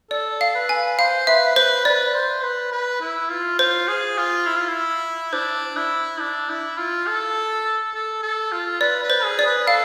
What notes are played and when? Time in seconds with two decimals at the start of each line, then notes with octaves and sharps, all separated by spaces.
0.11 A4 D5
0.41 F5
0.55 B4
0.69 G#5
0.98 C5 F5
1.27 B4 E5
1.56 B4 C5
1.85 B4 D5
2.14 C5
2.43 B4
2.72 B4
3.01 E4
3.30 F4
3.59 F4 C5
3.88 G#4
4.18 F4
4.46 E4
4.57 F4
4.68 E4
5.33 D4 C5
5.76 E4
6.20 D4
6.49 E4
6.77 F4
7.07 A4
7.94 A4
8.22 A4
8.52 F4
8.81 B4 D5
9.03 B4
9.10 C5
9.24 G#4
9.39 D5
9.46 B4
9.67 A4 F5